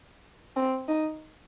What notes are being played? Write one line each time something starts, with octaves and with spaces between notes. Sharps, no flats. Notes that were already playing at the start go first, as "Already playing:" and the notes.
C4
D#4